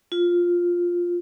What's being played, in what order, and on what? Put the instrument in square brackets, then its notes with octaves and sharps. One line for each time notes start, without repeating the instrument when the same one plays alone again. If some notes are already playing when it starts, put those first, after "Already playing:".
[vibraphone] F4